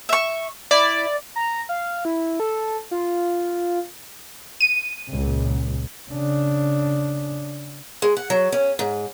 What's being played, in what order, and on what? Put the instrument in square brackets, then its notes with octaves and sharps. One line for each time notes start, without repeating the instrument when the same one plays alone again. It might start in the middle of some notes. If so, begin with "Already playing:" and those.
[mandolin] E5 C#6
[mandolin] E4 [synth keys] D5
[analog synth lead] A#5
F5
E4
A4
F4
[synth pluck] D#7
[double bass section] C#2 A#2
[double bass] C#3 D4
[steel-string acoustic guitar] G#3
F#5
F#3
C#4
G#2